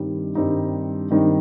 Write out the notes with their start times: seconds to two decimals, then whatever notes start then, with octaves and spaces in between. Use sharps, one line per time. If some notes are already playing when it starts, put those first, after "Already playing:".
Already playing: G2 D#3 G3 C4 D#4
0.35 G2 D#3 G3 C4 D#4
1.11 G2 D#3 G3 C4 D#4